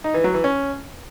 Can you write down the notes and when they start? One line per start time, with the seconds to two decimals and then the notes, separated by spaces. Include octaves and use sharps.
0.04 D#4
0.14 E3
0.24 F#3
0.34 E3
0.44 C#4